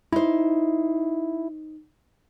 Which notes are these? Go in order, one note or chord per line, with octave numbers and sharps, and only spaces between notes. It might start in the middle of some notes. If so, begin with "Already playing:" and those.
D#4 E4 C5